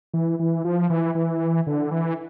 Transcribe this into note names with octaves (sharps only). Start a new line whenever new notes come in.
E3
E3
F3
E3
E3
D3
E3